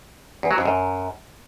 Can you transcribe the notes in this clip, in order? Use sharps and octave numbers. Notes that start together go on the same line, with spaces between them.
E2
F#3
F2
F#2